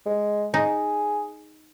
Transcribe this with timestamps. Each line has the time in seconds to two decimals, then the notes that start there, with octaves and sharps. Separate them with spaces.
0.06 G#3
0.54 D#4 G#4